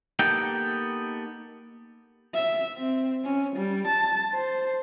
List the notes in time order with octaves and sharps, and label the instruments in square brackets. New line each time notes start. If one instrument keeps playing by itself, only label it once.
[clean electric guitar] A#3 B3 D#4 G4 A4 G5
[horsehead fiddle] E5
C4
C#4
G3
A5
C5